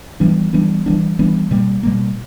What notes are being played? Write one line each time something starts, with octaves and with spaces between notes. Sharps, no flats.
E3 G3 B3 D4
E3 G3 B3 D4
E3 G3 B3 D4
E3 G3 B3 D4
B2 G3 A#3
B2 G3 A#3